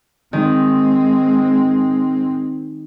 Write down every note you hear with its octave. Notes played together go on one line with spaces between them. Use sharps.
D#3 G#3 C4